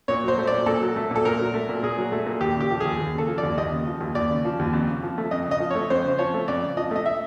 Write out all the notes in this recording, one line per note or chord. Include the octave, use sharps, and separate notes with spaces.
A#2 C#5
F#3 C5
A3
A#2 D5
A#2 A4
F#3
A3
A#2 A4
A#2 A#4
F#3
A3
A#2
A#2 G#4
F#3
A3
A#2
D#2 G4
C#3 G4
F3
D#2 G#4
D#2
C#3 A4
F3
D5
D#2
D#2 D#5
C#3
F3
D#2
D#2 D5
C#3
F3
D#2
F2
C#3
F3
A3
F2 D#5
C#3
D#5
F3
A3 C#5
F2 C5
C#3
F3 C#5
A3
F2 D5
C#3
F3 D#5
A3 D#5
E5